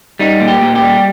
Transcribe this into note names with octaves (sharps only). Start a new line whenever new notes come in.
G3 D#4
A#2
G4
A#2
G4
G3